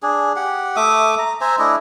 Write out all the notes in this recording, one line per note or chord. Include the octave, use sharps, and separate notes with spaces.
D4 G#4
G4 F#5
A3 E5 D6 D#6
A#5
C5 E5 G#5 A#5
A3 D4 E4 D#5